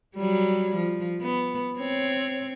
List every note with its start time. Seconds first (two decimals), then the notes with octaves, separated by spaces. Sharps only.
0.16 F#3 G3
0.76 F3
1.22 B3
1.78 C4 C#5